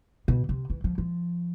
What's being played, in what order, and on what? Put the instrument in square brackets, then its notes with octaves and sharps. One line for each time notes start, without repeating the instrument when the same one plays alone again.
[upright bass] B2
C3
E3
F3
F3